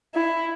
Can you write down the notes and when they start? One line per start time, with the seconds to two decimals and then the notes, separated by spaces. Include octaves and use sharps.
0.14 E4